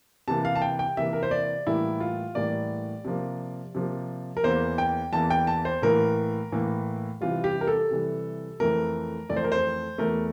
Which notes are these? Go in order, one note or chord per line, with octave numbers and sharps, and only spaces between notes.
C3 E3 A#3 A5
F5
A5
G5
G5
C3 E3 A#3 E5
A#4
C5
D5
A2 E3 G3 A#3 E4
F4
A2 E3 G3 A#3 D5
C3 F3 A#3
C3 F3 A#3
A#4
E2 E3 A#3 C5
G5
E2 E3 A#3 A5
G5
A5
C5
A2 E3 A#3 A#4
A2 E3 A#3
C3 E3 G3 F4
G4
A#4
A4
C3 E3 G3
F2 E3 A3 A#4
F2 E3 A3 D5
C5
A#4
C5
E2 E3 A3 A#4